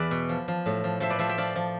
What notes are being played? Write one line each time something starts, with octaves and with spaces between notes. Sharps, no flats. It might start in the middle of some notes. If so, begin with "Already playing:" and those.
Already playing: E2 B4 D5 E5
B2
F3
F3
A2
F3
F3 C5 E5
B4 D5
F3 C5 E5
E5 G5
F3 D5 F5
F3